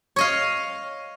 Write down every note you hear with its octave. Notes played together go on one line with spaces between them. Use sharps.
C#5 D#5 F5